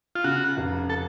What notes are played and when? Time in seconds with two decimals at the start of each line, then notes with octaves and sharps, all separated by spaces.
0.15 F4
0.24 C#3 F#4
0.57 F1
0.90 A4